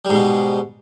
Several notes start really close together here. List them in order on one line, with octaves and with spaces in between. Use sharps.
G3 G#2 B2